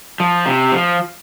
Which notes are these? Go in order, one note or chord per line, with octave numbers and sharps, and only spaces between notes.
F3
C3
F3